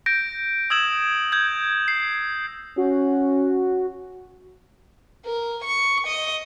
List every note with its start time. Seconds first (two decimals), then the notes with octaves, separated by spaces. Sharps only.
0.06 G6 A#6 D7
0.70 D#6 E6 G#6 E7 F#7
1.32 G6 G#6
1.88 C7
2.77 C#4 F#4
5.25 A#4
5.64 C#6
6.07 D#5